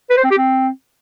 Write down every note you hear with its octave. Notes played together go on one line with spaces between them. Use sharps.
B4
C5
C4
G4
C4